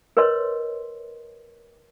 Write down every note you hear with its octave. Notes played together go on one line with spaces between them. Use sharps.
A#4 B4 C#5 D#5 C6